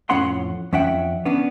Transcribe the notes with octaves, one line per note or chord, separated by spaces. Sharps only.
F2 A2 C#4 C#5 F#5 C6
F2 C#4 E5 F#5 G5
B3 C#4 D4